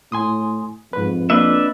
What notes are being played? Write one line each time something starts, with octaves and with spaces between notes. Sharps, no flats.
A2 G#5 C6 D#6
F2 G#2 B4
A#3 D4 B4 D#5 E5